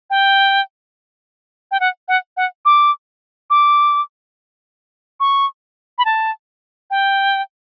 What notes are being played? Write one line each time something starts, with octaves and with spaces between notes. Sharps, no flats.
G5
G5
F#5
F#5
F#5
D6
D6
C#6
B5
A5
G5